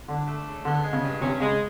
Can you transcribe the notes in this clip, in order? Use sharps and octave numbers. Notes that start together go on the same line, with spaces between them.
D3 D4
A3
C#3
D3 B3
G#3
C#3
G2
C3 C#4
C#3 G#3